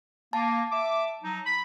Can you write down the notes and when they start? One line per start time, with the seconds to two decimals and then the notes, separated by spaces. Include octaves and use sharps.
0.33 A#3 A5
0.71 E5 D6
1.23 F#3 D#4
1.46 B5